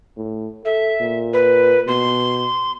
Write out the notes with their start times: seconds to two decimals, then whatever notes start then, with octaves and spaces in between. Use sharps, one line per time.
0.17 A2
0.65 A4 E5
1.01 A#2
1.33 B4
1.87 B2 C6